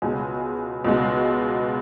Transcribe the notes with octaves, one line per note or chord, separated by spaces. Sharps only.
C#2 B2 G#3 G#5
C#2 B2 G#3